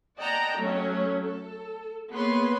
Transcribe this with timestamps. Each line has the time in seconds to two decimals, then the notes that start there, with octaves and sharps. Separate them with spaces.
0.18 D5 D#5 F#5 G5 A5 A#5
0.57 F#3 A3 C#4
1.25 A4
2.10 A#3 B3 G#4 B4 C#5 C6